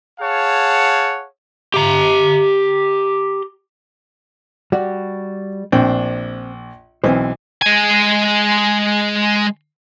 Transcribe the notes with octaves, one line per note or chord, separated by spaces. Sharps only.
G#4 C#5 F5 F#5 A5
G4 A#5
G3 F#4 D5
A#1 C4 D4 G5
B1 E3 C4 C5
G#3 G#5